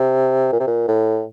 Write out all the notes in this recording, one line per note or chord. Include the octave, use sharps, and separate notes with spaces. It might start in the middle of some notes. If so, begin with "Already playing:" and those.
Already playing: C3
A#2
C3
A#2
A2